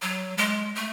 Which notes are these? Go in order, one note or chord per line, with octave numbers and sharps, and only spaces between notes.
F#3
G#3
A3